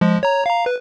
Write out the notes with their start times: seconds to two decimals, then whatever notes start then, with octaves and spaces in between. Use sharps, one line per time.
0.01 F3 G#3
0.23 C#5 A#5
0.46 F5 A#5
0.66 B4